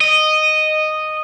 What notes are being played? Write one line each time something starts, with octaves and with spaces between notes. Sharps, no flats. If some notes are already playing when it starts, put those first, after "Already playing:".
D#5